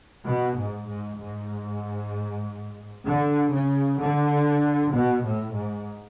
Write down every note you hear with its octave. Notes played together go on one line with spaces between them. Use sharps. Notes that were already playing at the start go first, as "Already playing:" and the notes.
B2
G#2
G#2
G#2
D3
C#3
D3
B2
A2
G#2